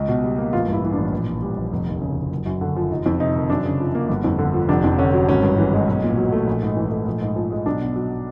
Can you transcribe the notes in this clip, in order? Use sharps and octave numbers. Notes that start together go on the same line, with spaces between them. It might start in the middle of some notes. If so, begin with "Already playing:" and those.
Already playing: C#2
B2
G3
A#3
A1 F4
G2
E4
E3
D4
A1
A#1
A#2
G3
A#1
F1
D#2
C#3
F1
F#1
F#2
D3
F3
F1 D#4
F2
C3 D#4
D#3
F#2 D4
C#3
F3
A#3
G1
F2
D3
F3
F1 D4
F2
D3 C#4
F#3
G#1 C#4
G2
E3
G#3
B1
A#2
F#3
A3
A#1
G#2
E3
A3
A#1
G#2
F3
G#3
B1 D4
B2
F#3